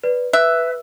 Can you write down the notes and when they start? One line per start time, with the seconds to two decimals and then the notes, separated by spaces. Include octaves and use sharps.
0.04 B4 D5
0.33 B4 E5 F#6